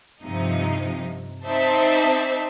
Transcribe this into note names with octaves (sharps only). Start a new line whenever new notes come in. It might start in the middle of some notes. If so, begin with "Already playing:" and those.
G2 C3 F3 D#4
C4 D#4 C5 D5 E5 A5